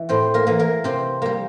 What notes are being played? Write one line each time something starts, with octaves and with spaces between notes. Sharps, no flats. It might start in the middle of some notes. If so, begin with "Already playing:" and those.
Already playing: E3
A2 C4 C5
A#3 A#4
E3 A#3
A#3 A#4
C3 C4 C5
G3 A#3